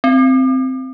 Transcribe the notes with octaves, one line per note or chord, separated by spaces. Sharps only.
C4